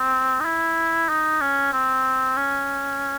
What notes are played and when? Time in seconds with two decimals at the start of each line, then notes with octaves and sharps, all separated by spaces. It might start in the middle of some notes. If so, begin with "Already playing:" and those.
Already playing: C4
0.40 D#4
0.45 E4
1.09 D#4
1.41 C#4
1.73 C4
2.37 C#4